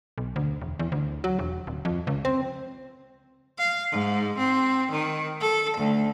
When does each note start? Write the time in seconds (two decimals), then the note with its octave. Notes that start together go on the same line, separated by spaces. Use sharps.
0.18 B1
0.36 D2
0.62 E1
0.79 E2
0.92 D2
1.24 F#3
1.39 E1
1.67 D1
1.85 F2
2.07 C#2
2.25 C4
3.58 F5
3.91 G#2
4.38 C4
4.92 D#3
5.41 A4
5.77 D2